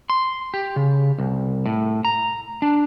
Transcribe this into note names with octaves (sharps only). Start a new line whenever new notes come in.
C6
G4
C#3
C2
A2
A#5
D4